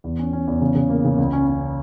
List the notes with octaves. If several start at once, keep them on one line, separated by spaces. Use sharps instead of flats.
E2
C#4
C#4
E2
C#3
C#3
A#3
C#3
C#2
C#4
C#4